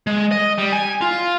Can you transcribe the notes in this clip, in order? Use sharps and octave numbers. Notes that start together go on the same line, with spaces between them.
G#3
D#5
G3
G#5
F4